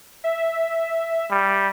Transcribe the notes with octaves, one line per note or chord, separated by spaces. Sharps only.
E5
G3